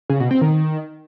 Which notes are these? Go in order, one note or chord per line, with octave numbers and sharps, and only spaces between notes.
C#3
B2
C4
D#3